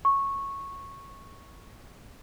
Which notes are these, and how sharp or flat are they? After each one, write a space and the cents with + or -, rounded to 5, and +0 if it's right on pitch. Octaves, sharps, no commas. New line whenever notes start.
C#6 -10